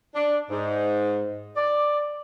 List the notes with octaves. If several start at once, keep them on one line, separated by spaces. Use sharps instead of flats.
D4
G#2
D5